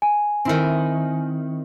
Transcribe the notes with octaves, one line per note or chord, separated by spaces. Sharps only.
G#5
D#3 C4 E4 C5 C6